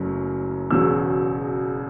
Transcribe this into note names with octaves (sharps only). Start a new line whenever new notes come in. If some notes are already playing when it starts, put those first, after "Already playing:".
Already playing: F#1 F#2 F#3 A3 C#4
E1 E2 C#3 F#3 E6